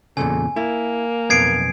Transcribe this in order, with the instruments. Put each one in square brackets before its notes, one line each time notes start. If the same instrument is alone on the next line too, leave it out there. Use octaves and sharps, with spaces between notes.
[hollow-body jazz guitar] E2 A#2 C#3 [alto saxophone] A4 [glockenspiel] G#5
[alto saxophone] A#3 [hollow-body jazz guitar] E4
[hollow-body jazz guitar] B1 F2 B3 [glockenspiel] G#6 C7 D7